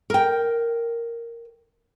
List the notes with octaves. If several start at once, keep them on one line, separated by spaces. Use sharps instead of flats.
A#4 G5